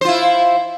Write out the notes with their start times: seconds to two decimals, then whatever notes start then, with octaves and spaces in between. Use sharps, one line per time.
0.01 C5
0.05 F4
0.08 E4